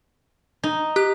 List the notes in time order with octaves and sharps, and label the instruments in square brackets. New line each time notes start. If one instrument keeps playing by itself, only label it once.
[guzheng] D#4
[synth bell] G4 F#6